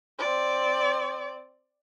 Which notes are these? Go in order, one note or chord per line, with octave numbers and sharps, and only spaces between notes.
C4 D5